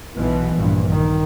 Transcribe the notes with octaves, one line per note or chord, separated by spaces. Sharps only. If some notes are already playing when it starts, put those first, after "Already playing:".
B1 B2 E3
A#1 G2
D#3